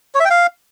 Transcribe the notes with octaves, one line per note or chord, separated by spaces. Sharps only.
C#5
E5
G5
F5